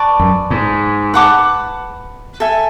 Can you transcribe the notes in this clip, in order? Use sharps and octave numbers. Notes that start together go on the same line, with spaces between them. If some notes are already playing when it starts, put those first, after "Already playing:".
Already playing: B4 D5 A5 C#6
F#2
G#2
B4 F#5 A5 D6
A4 E5 G#5